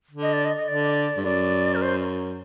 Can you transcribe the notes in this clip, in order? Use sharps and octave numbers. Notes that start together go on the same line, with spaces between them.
D3
D#5
D5
D#5
D#5
D3 D5
G2
F#2 D5
A#4
C5